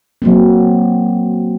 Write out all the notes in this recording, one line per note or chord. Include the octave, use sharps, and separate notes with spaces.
F#3 A#3 C4